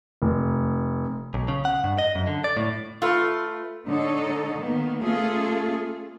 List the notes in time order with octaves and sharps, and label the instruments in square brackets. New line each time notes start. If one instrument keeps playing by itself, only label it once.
[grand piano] F1
[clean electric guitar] B1
C#3
F#5
G2
D#5
F#2
D3
D5
A2
[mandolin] A3 B4 [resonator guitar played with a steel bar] F4
[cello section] D3 G#3 D#4 A4 C#5 D#5
D#3 A#3 B3
A3 A#3 C#4 F4 G#4 A4